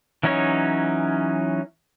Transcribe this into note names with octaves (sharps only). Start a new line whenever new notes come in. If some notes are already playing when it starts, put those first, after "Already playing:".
E3 F#3 C#4 D#4 C#5